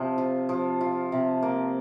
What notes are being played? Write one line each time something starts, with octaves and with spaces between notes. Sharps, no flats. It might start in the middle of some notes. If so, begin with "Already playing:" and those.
Already playing: C3 F3
F4
F3
F4
C3
A#3